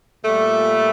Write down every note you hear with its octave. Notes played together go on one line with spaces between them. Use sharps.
A#2 G3 A3